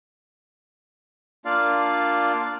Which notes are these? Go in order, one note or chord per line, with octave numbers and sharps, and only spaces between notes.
A#3 D4 F4 D5 F5